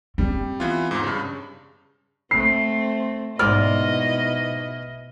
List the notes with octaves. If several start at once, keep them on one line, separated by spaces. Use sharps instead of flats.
G3 C4
E3 B3 F4
E2 G#2
G2 C#3
A3 C4 C7
G#2 B2 E4 D5 D#5 F6